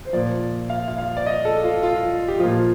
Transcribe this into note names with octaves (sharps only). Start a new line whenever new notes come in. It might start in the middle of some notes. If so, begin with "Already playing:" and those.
C5
A#2 F3 D5
F5
F5
F5
D5
D#5
A4
F4
F4
G4
A#2 F3 F4